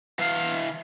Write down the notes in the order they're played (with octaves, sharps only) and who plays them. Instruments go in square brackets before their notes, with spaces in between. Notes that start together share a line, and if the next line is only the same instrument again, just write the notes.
[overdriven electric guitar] E3 F5